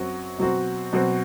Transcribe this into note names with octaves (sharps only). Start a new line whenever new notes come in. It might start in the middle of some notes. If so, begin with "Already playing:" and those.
Already playing: F#2 F#3 C4 F#4
B2 F#3 C4 F#4
B2 F#3 C4 F#4